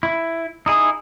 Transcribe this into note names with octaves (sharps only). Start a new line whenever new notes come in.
E4
D#4 E4 G#4